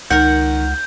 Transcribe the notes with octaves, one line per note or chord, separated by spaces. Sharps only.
C#2 D#3 A#4 F#5 G6